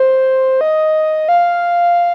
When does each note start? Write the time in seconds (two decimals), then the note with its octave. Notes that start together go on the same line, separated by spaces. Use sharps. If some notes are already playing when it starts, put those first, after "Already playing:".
Already playing: C5
0.61 D#5
1.29 F5